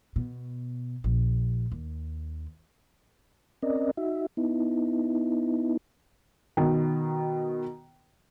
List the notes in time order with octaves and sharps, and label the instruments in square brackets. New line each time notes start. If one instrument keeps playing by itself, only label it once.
[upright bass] B2
A#1
D#2
[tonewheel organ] C4 C#4 A#4 D5 D#5
D#4 F#4 E5
B3 D#4 E4
[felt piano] B2 D#3